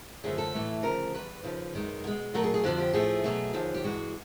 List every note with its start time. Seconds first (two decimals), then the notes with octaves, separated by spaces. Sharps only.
0.24 F#2 D3 F3 A3 G#4
0.38 A4
0.54 A2 E3 A3
0.83 D2 C#3 F3 A#4
1.14 E2 B2 G3 B4
1.43 D#2 C#3 F3
1.73 F#2 D#3 G#3
2.04 B2 G#3
2.34 A#2 F#3 A3 A#4
2.44 G#4
2.54 G#4
2.64 F2 D3 F3 F#4
2.78 G4
2.93 A2 F3 A3 G#4
3.24 B2 F#3 A3
3.54 D#2 D3 F3
3.74 G4
3.84 G2 E3 G#3 F#4